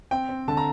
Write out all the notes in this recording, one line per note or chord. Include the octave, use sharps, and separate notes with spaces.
C4 G5
C4
D3 A5
A#5